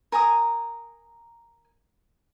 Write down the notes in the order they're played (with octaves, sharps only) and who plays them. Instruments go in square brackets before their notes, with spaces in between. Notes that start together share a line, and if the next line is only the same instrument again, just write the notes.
[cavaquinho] A#4 G#5 A#5 D#6